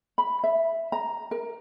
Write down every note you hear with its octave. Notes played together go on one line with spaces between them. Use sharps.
B5
E5
A#5
A#4